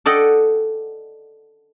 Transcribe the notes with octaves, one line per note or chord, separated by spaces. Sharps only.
A4 D5 D#5 F#5 G5